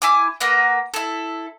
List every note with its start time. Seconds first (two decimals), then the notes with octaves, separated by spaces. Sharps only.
0.02 E4 G#5 D6
0.40 A#3 A#4 B4 F#5
0.94 E4 A4